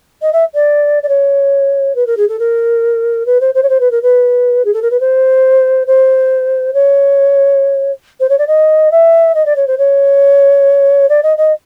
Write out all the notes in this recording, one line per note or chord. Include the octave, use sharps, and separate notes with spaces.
D#5
E5
D5
D5
C#5
B4
A#4
G#4
A4
A#4
B4
C5
C5
C#5
C5
B4
A#4
B4
G#4
A4
A#4
B4
C5
C5
C#5
C5
C#5
D5
D#5
E5
D#5
D5
C#5
C5
C#5
D5
D#5
D#5